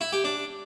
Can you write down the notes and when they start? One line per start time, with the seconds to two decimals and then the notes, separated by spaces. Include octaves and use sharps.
0.01 E4
0.13 G4
0.24 D4